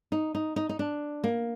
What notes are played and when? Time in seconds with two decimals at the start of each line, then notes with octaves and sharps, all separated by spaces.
0.12 D#4
0.35 D#4
0.56 D#4
0.69 D#4
0.79 D4
1.24 A#3